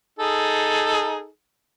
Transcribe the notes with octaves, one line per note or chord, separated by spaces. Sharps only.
D#4 G#4 A4